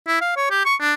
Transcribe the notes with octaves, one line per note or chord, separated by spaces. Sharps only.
E4
F5
C#5
G4
C#6
D4